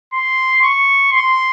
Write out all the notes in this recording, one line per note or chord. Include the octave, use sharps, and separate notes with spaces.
C6
C#6
C6